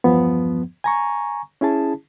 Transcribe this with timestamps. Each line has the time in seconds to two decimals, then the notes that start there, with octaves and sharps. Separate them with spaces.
0.04 E2 G2 F3 B3
0.84 G#5 A#5 C#6
1.61 C#4 E4 G#4 A5